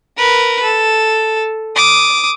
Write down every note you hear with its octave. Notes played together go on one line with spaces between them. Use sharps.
A#4 B4
A4
D6 D#6